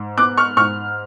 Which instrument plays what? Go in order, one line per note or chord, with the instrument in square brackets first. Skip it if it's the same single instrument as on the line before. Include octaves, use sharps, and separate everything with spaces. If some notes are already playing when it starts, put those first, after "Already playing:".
Already playing: [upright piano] G#2
B3 D6 F#6
C#6 F6
G#2 C#6 F6